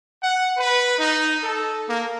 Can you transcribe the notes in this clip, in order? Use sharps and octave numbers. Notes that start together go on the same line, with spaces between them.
F#5
B4
D#4
A4
A#3